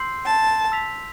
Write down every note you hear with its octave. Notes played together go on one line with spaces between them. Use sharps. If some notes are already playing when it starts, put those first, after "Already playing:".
Already playing: C6 E6 G6 C7
A5
E6 B6 F7